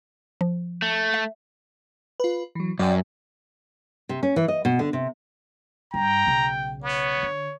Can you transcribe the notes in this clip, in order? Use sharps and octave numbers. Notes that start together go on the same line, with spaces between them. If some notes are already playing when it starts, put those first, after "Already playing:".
F3
A3
E5
F4 B4
E3 F#3
F#2 D5 G5
C3
C#4
E3
D#5
B2
D3
C3
G2 G5 A#5
B1 C#3
B3 C#5
D3